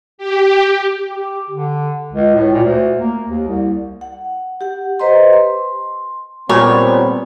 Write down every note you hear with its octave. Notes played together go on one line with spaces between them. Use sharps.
G4
G4
D3
C#2
A2
A#2
D2
A#3
D#2
C2
F#5
G4 F#5
G4 B4 C5 D#5 A#5 C6
C6
A#2 G3 B3 C4 C#5